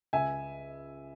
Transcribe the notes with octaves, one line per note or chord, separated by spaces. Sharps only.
C#2 E5 G#5